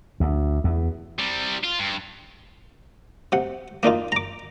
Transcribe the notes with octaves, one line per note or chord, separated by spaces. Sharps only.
D2
E2
C3 G3
F4
G2
C3 F#5
A#3 D4 D#4 F4
A#5 D6